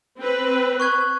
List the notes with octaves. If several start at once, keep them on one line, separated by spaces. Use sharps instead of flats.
C4 B4
C#6 F#6 G#6